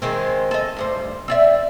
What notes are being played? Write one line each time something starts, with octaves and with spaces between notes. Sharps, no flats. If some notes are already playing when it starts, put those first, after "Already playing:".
D#3 G#3 C4
A4 D#5
D2 G2 C5
C4 D5 E5